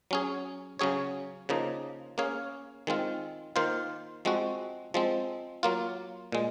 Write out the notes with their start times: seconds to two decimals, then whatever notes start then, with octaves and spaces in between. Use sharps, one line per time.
0.11 F#3 C#4 G#4
0.79 C#3 F#3 C#4 G#4 C#5
1.49 C#3 F3 A#3 D#4
2.18 A#3 C#4 G#4 C#5 F5
2.87 D#3 G#3 C4 F4
3.56 D#3 A#3 F4 C5 F5
4.25 F3 G#3 C4 F#4
4.94 F3 G#3 C4
5.63 F#3 A#3 F4
6.32 A#2 G#3